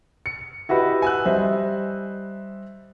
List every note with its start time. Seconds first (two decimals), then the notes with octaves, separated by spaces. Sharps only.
0.26 C#7
0.69 E4 F#4 G4 B4 D#5
1.02 G#5 E6 F#6
1.26 G3 C5 D#5 E5